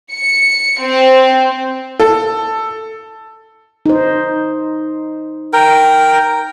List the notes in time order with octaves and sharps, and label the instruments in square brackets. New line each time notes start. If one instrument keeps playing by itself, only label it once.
[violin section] C#7
C4
[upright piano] A4
[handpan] D#4 C5
[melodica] A#4 G5